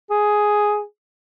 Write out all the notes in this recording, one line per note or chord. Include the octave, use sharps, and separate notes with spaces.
G#4